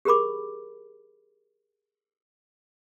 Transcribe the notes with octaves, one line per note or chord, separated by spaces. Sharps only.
G4 G#4 A#4 B5 D6